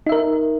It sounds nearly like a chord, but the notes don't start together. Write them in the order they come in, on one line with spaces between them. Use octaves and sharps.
D#4 E5 A#4